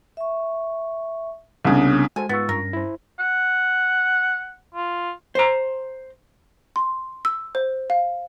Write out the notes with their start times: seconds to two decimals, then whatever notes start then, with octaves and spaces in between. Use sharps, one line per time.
0.17 E5 C#6
1.65 C2 C#3 B3 D4 D#6
2.16 G#3 F#4 A4 C5 G#5
2.29 G#2 B3 F4 C#6 E6 A6
2.49 G2 C#4 A#4 A#6
2.73 E4 C5
3.20 F#5
4.74 F4
5.35 C5 A#5
6.76 C6
7.25 E6
7.55 C5
7.90 F5